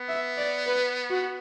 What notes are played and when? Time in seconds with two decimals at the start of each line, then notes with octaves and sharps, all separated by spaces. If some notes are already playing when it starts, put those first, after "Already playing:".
Already playing: B3
0.08 E5
0.38 D5
0.67 B4
1.11 F#4